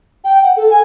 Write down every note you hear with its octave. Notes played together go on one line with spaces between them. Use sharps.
G5
F#5
A4
G#5